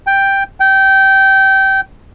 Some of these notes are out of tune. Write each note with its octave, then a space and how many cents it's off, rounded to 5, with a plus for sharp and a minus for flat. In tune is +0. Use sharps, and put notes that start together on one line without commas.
G5 +5
G5 -20